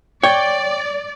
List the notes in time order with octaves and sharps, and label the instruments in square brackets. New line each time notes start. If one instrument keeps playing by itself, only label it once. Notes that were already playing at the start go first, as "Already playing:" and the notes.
[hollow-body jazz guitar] C#5 [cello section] D5 [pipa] G5